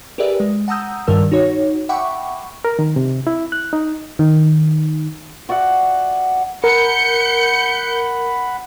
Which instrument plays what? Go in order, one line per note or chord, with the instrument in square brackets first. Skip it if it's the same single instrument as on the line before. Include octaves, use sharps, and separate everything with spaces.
[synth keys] G4 G#4 A#4 B4 D5 E5
G#3
F#5 A5 A#5 D#6 E6 G6
G2 D#3 G3 A#4 A5 E6
D#4 F#4 C#5
E5 F#5 G5 B5 C#6 D6
[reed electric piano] A#4
D#3
C3
E4
F#6
D#4
[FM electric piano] D#3
[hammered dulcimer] F#4 D5 E5 F#5
[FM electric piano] A#4 [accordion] F#5 B5 [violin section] G6 C#7